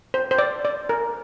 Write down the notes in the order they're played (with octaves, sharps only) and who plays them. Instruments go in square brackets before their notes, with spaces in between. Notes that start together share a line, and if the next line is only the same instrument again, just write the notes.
[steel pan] C5
C5
D5
D5
A#4